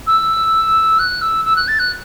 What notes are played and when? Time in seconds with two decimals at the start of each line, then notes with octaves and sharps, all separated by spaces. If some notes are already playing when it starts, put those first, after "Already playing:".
0.07 E6
0.99 F#6
1.22 E6
1.45 E6
1.56 F#6
1.68 A6
1.79 F#6